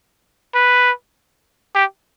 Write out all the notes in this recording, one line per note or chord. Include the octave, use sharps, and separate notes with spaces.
B4
G4